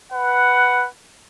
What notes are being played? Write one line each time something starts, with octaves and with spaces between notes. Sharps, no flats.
B4 F#5